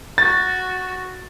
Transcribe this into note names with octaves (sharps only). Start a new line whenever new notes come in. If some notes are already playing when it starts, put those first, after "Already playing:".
F#4 A6